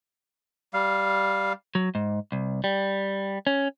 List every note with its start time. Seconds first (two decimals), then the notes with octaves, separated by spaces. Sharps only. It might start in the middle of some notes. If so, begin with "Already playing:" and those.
0.74 G3 F5
1.75 F#3
1.95 G#2
2.32 C2
2.64 G3
3.47 C#4